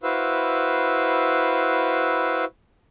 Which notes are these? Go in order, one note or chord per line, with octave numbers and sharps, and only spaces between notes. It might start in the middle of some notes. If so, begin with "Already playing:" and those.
E4 F#4 B4 C5 F5 E6